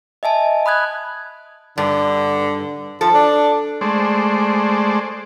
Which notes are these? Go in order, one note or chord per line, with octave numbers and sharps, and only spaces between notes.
D#5 E5 G#5 A5
B5 D#6 F#6 G#6
G2 D3
F3 A4
D4
G#3 A3 C5 D5